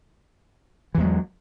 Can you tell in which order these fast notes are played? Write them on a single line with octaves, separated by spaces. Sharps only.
E3 E2 G#3 F#3